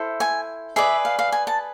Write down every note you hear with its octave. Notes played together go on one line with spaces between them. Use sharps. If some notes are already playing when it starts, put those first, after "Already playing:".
Already playing: E4 A4 C5
G#5
G#4 B4 D5 E5
F5
F5
G#5
A5